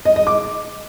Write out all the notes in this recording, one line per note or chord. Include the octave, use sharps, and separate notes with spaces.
D#5
D#5
D6